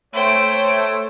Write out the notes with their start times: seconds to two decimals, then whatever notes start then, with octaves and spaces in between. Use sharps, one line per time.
0.13 A3 C5 C#5 G5